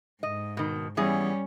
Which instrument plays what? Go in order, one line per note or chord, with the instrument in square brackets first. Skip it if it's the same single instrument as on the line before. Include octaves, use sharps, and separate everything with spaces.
[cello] G#2 [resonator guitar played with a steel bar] D#5
[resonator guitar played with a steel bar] B2 D#3
[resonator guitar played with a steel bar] E3 B3 G#4 [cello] G3 C#4